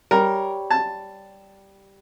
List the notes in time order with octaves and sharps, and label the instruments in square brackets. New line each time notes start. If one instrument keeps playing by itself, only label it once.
[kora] G3 C#5 [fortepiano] A#4
[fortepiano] A5